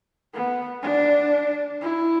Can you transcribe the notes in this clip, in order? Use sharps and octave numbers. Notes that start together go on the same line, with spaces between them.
B3
D4
E4